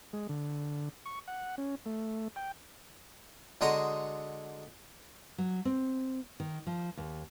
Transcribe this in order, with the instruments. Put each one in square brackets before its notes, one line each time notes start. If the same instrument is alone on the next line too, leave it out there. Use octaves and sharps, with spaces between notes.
[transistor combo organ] G#3
D3
C#6
F#5
C#4
A3
G5
[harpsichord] D3 G#3 F#4 A#5 C6 D#6
[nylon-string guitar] F#3
C4
D#3
F3
D#2